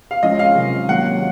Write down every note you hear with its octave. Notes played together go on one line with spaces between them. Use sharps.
F5
F3 G#3 C#4 F4 D#5
F5
C3 D#3 F#3
D#3 F#3 A#3 F#5